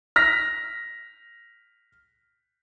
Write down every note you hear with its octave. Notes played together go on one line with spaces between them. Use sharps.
F6 A#6 B6